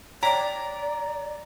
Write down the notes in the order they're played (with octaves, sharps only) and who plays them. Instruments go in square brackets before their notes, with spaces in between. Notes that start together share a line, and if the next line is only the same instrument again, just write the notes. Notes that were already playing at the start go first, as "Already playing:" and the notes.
[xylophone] C#5 G5 B6 [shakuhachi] D5 [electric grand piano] A#5